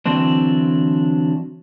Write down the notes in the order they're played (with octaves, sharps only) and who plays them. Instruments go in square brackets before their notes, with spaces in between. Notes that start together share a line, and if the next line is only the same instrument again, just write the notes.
[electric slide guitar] D3 E3 F#3 C4 D4